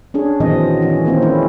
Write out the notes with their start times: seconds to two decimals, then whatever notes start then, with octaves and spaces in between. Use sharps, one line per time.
0.14 C#4 D4 G#4
0.40 A#2 D#3 E3 F#3 C4 D#5
0.82 E3 C#4
1.05 D#3 A#3 C4 C#4
1.22 G#3 C#4 E4